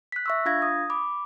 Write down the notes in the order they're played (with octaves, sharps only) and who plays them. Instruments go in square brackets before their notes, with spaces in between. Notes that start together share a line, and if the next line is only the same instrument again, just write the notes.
[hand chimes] F#6 B6
E5 C#6 E6
D4 F4 F5 G#6 A#6
D#6
B5 D6